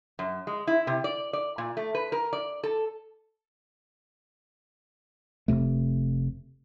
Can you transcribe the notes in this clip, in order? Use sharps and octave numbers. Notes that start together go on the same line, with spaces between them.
F#2
G#3
E4
C3
D5
D5
A#2
A3
B4
A#4
D5
A4
F1 F2 C3 A3